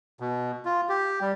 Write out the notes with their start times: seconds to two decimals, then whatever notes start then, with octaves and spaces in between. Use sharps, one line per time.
0.20 B2
0.65 F4
0.89 G4
1.21 G3